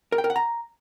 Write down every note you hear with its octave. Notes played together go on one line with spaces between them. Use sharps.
A#4
G5
A#4
F#5
A#5